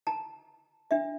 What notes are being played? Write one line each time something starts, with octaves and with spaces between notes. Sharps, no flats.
A5 A#5
D4 E5